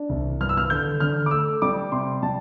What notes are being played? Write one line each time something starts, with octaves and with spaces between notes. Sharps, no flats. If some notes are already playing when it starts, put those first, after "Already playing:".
Already playing: D4
C2
G2 F6
E6
F6
D3 G6
D3 F6
D6
A3 E6
G3 D6
C3 C6
G3 A5